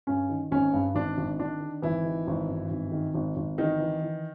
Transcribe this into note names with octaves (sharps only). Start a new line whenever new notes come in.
G2 C#4
D#3
G#1 C#4
G2
G#1 D4
G#1
D#3 D4
D#3
G#1 E3 E4
D#3
G#1
G2
G#1
D#3
G#1
G#1
D#3 E3 D#4
E3
E3